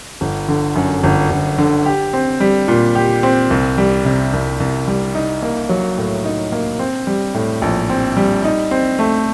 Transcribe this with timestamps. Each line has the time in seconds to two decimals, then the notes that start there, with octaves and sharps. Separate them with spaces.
0.21 G1
0.48 D3
0.76 F#2
1.03 G1
1.31 G1
1.58 D3
1.86 G4
2.13 C4
2.40 G3
2.68 A#2
2.95 G4
3.23 C4
3.51 C2
3.78 G3
4.05 C3
4.33 C2
4.60 C2
4.87 G3
5.15 D#4
5.42 A#3
5.69 F#3
5.97 A2
6.25 D#4
6.52 A#3
6.79 C4
7.07 G3
7.34 A2
7.62 A#1
7.89 C4
8.17 G3
8.44 D#4
8.71 C4
8.99 A3